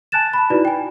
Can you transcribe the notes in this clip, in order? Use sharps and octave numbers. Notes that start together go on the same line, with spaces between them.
G#5 A5 F#6 A6 E7
A5 B5
D#4 E4 F#4 B4 D5
G5 G#5